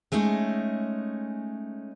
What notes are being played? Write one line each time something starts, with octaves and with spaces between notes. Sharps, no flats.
G#3 A3 C#4 D#4